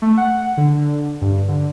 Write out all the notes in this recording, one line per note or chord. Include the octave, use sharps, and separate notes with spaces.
A3
F#5
D3
G2
D3